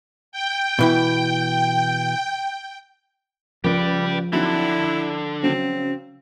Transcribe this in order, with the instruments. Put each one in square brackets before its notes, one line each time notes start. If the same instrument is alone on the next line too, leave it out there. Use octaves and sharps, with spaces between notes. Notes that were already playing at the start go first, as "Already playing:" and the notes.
[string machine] G5
[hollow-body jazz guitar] B2 E3 E4
[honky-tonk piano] C#2 B4 D7 [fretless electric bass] F3 [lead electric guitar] G4 D5
[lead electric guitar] D3 [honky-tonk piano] F#3 C4 D#4 [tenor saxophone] E4
[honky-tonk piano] E6
[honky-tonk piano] C#3 F#3 [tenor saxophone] C4